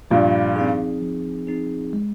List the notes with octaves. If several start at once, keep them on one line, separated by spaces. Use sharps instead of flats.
G2 A#2 F3
C4 D#4 G#4
F3
C4 D#4 G#4
G#3